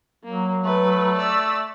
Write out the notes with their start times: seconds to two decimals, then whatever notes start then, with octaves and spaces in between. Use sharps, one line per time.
0.24 F#3 A#3
0.65 A3 B4
1.17 D5 E6